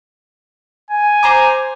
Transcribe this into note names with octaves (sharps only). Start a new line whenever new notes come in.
G#5
C5 A#5 D6